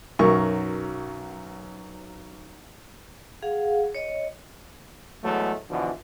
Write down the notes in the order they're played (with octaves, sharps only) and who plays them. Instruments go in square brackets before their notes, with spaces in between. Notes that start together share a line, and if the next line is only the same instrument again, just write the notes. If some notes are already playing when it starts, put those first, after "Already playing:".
[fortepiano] B1 F#2 A#4 C#6
[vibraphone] G#4 F5 F#5
C#5 D#5
[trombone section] E2 F#3 G#3 A3
B2 D3 E3 F3